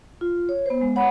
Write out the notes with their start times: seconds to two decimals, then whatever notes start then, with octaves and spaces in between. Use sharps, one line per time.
0.21 F4
0.49 C#5
0.66 B3 C5
0.81 G#3
0.96 C#5 F#5 B5